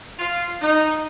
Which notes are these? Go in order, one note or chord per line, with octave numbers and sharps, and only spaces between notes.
F4
D#4